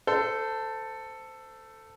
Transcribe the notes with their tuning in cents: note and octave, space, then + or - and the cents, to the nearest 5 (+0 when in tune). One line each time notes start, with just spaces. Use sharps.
A4 +10 C5 -20